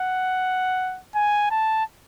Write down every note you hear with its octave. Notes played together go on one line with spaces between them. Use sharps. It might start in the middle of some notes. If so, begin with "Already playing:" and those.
Already playing: F#5
G#5
A5